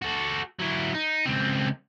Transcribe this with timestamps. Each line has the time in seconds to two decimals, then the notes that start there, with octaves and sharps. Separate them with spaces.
0.02 F#4 A4
0.59 F#3 E4
0.94 D#4
1.25 C#2 C4